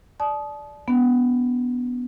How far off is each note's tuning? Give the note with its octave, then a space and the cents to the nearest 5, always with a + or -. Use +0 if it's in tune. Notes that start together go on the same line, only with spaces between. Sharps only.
D5 +0 A5 -30 D#6 +0
B3 +0 D4 -35